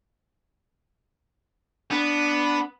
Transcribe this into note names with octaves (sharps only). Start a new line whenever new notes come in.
B3 D4